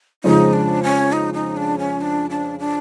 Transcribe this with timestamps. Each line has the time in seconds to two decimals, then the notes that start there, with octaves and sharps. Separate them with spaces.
0.24 F2 C#3 F3 G#3 D#4
0.53 D4
0.83 C#4
1.13 D#4
1.34 D#4
1.57 D4
1.79 C#4
2.01 D4
2.30 D4
2.59 D4